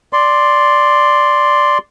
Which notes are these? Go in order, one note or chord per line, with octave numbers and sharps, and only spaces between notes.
D5 C6